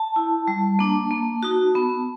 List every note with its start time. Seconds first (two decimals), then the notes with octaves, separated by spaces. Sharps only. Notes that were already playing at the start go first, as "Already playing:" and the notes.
Already playing: A5
0.16 E4
0.48 G3
0.79 A#3 D4
1.11 A#3
1.43 D#4 F#4
1.75 B3